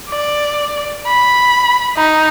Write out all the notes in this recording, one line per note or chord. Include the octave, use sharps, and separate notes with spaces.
D5
B5
D#4